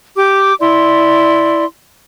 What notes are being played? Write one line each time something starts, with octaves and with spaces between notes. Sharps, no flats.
G4 D6
E4 D5 C6